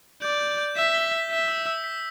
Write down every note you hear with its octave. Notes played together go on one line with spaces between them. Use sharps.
D5 G6
G6
G6
E5 B6
G7
B6
E5 B6
E6
E6
B6